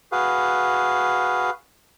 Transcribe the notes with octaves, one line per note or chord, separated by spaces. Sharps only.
F#4 G#4 B4 F5